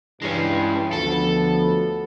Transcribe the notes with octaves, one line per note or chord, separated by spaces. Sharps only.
G2 E3 G#3 C#4
D2 F3 B3 A4